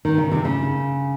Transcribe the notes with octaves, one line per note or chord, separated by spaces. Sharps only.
D#3
C#3
C3
C#3